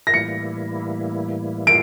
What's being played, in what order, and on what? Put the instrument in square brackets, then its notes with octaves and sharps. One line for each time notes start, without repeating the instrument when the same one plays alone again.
[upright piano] A#6
[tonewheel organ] A2 E3 G3 A#3 E4 [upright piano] C#7
[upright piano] D7